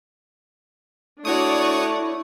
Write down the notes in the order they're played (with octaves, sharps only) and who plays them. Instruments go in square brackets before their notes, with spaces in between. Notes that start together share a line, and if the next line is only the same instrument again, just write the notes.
[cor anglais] A3 [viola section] D4 C#5 D5 [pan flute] E4 [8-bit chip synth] F#4 C#6 D#6